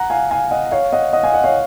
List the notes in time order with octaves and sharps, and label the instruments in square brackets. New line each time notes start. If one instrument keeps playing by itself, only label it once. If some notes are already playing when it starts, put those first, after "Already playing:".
Already playing: [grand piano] F#5 A#5
F5 G#5
F5 G#5
D#5 F#5
C#5 F5
D#5 F#5
D#5 F#5
F5 G#5
D#5 F#5
C#5 F5